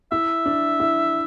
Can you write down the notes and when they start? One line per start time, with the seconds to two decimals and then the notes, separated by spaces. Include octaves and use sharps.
0.12 E4 E5
0.46 D4
0.80 E4